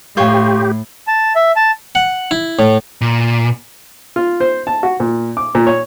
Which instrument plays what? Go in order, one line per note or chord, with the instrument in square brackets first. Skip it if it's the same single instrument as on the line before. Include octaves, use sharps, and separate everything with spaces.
[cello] A2 [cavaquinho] F4 C5 C#5 [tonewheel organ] G4
[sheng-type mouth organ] A5
E5
A5
[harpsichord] F#5
E4
A2
[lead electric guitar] A#2
[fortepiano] F4
C5
A5
F#4
A#2
D6
A#2
C#5